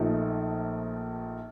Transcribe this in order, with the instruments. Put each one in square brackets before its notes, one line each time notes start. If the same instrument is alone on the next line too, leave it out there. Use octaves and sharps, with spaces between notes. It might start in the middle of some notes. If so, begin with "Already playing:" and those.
Already playing: [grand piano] A#1 A#2 F3 A3 D#4